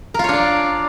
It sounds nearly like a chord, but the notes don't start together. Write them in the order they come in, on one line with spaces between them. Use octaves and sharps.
A#4 F4 C#5 D4 D5